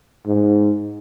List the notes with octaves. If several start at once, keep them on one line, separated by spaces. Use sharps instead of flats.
G#2